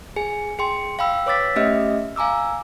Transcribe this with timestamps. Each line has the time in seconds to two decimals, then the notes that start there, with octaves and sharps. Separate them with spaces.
0.16 G#4 G#5
0.59 G#4 G5 C6
0.99 F5 G5 B5 E6
1.26 B4 C#5 D6 E6 A6 B6
1.56 A3 C#4 G4 D#5 E5 F6
2.16 F5 G#5 A#5 D6 E6